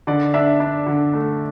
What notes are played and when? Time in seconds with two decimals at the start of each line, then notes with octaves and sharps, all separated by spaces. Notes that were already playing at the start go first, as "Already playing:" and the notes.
0.07 D3 D5
0.34 D4 E5
0.60 D4
0.86 D3
1.14 A3